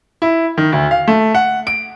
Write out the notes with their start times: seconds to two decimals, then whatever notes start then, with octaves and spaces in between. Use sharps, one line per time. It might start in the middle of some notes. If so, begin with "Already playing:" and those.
0.22 E4
0.58 D#3
0.72 D2
0.91 F5
1.08 A3
1.35 F#5
1.67 D7